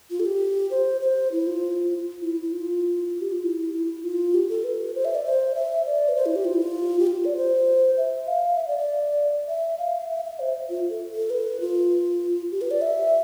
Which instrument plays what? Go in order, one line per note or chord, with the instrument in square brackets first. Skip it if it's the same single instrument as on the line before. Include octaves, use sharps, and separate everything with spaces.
[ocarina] F4
A4
G4
C5
C5
E4
F4
E4
E4
F4
G4
F4
E4
E4
F4
G4
A4
B4
C5
E5
D5
C5
E5
D5
B4
C5
E4
G4
F4
E4
F4
G4
F4
D5
C5
E5
F5
E5
D5
D5
E5
F5
E5
E5
C5
F4
A4
A4
B4
F4
G4
B4
D5
E5